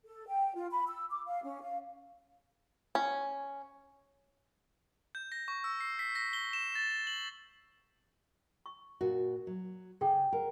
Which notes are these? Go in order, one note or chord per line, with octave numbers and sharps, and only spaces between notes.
A4
G5
F4
B5
E6
D6
F5
C#4
F5
C#4
G6
A#6
C#6
E6
C7
B6
A#6
G7
E7
A6
A6
F#7
C#6
A#2 F#4
F#3
C#3 G#4 A4 G5
A#4 F#5